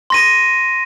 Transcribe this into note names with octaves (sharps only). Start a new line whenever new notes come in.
C6 A#6 D#7